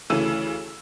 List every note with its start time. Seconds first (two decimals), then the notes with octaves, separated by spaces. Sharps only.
0.10 D2 C#3 E3 A4 E6 D#7